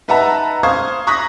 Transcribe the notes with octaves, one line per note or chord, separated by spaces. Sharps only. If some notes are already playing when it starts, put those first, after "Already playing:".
D#4 B4 E5 F#5 A5 A#5
C5 F5 C#6 D#6 G#6
A#5 C#6 D#6 F#6 A#6 B6